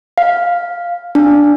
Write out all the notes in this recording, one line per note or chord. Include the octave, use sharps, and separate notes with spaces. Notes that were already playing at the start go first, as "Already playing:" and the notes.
F5
D4